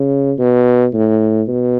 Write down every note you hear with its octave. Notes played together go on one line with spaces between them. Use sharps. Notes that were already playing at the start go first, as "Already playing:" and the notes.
Already playing: C#3
B2
A2
B2